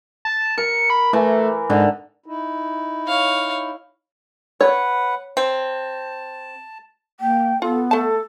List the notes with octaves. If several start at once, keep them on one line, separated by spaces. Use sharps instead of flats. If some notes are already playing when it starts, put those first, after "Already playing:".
A5
A#4 C#7
B5
E3 A3
G#2 D3
D#4 E4
C#5 F5
B4 C#5 F#5
C4 A5
A#3 G5
B3 F4 A4
A3 A4 A5